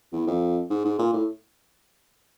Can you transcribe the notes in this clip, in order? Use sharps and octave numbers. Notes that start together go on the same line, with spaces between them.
E2
F2
G#2
G#2
A#2
A2